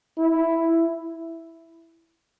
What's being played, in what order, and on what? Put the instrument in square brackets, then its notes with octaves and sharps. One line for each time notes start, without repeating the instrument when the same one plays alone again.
[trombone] E4